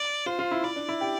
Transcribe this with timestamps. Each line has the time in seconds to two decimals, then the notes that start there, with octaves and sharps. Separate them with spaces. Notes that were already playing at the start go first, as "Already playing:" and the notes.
Already playing: D5
0.26 F4 C5
0.39 F4
0.51 E4
0.64 E4 D5
0.76 D4
0.89 E4
1.01 G4